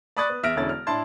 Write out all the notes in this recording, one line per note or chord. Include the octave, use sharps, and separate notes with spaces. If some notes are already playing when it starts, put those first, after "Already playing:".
D5 B5 C#6 D#6 F#6 A6
B3
E2 E5 F6 A#6 D7
E1 D3 C#4 E4 A4 A6
F6
A2 D4 E4 A5 C6 A6